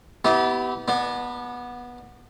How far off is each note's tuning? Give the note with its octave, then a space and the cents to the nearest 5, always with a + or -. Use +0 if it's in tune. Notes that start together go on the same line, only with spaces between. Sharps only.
B3 +10 E4 -35 G4 -25
B3 -15 D4 +35